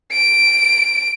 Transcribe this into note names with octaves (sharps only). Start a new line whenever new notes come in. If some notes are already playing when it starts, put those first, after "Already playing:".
D7